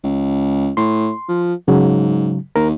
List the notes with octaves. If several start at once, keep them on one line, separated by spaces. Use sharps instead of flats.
C#2
A2 C6
F3
G#2 C#3 F#3
D#2 A#4